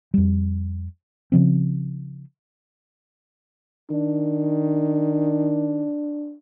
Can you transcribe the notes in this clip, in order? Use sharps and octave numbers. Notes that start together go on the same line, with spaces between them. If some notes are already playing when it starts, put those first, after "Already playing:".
F2 G3
C#3 F3 C4
D#3 D4